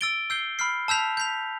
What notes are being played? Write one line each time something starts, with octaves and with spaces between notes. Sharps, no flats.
E6 A6 D7 G7
E6 G6 C7 G7
B5 F6 C7
A5 E6 G6 B6 F7
G6 B6 F7